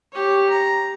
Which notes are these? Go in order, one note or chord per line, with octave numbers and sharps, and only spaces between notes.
G4 C#5
A#5